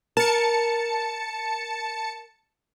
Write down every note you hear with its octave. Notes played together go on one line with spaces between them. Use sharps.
A#4 A5 C#7